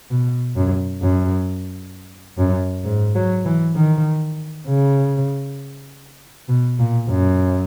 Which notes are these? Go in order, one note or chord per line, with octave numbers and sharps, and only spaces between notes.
B2
F#2
F#2
F#2
G#2
F#3
E3
D#3
C#3
B2
A#2
F#2